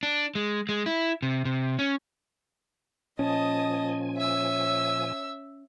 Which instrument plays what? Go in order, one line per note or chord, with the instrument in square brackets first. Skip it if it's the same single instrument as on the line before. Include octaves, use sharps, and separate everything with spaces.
[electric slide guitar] D4
G#3
G#3
E4
C3
C3
C#4
[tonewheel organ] A#2 F3 G#5 [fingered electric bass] C#4 [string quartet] D#5 A5 D#6
[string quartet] C#5 [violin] E5 E6